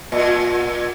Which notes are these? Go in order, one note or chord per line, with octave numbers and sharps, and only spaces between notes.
A#2